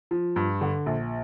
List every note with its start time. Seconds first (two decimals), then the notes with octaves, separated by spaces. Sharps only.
0.11 F3
0.36 G2
0.61 D3
0.86 A#1